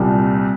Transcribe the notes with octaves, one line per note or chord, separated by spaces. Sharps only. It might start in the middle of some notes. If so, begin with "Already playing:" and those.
Already playing: C2 A#2 G3